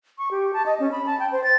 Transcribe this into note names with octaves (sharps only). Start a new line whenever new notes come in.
C#6
G4
A5
D#5
C#4
B5
A5
G5
C5
A6